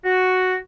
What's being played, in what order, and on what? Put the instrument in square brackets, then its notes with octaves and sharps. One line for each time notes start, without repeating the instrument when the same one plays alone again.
[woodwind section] F#4